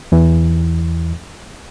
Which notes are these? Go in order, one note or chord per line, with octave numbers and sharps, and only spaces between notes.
E2 E3